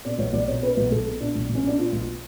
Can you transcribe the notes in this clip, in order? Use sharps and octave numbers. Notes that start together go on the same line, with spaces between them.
B2 D5
B1 C#5
B1 D5
B2 C#5
B2 B4
B1
B1 A4
B2
B2 D4
B1
B1
C#4
B2 D4
B2 F4
B1